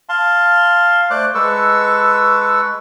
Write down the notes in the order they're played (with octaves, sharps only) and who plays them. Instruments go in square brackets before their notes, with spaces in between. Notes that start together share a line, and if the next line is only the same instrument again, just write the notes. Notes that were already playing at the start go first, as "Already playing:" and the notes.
[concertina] F5 A5 C6
A3 C5 D5 D6 F#6
G#3 A4 B4 C#6 E6